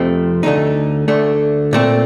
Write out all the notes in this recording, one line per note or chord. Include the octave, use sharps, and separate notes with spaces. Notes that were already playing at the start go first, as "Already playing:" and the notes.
Already playing: F2 C3 F3 A3 C4
D2 D3 A3 D#4
D2 D3 A3
A#2 A3 C4